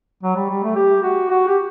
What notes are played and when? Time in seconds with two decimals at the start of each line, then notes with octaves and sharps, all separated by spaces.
0.23 F#3
0.35 G3
0.49 G3
0.63 A3
0.76 G4
1.03 F#4
1.30 F#4
1.48 G4